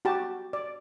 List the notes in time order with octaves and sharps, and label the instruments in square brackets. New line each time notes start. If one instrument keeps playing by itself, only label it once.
[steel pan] F#4 G4 A5
D5